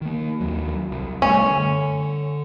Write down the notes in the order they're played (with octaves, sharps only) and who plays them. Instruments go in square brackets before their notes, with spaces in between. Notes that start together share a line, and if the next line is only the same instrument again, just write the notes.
[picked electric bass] D#3 A#3
D#2 F#3
C2
[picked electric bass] F#2 G3 A3 [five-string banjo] C#4
[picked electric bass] D3